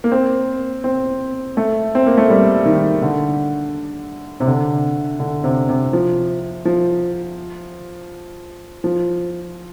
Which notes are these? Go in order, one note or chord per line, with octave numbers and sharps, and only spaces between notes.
A#3
C4
C4
A3
C4
A#3
A3
G3
D#3
D3
C3
D3
D3
C3
C3
F3
F3
F3